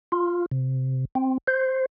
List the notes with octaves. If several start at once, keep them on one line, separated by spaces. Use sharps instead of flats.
F4
C3
C4
C5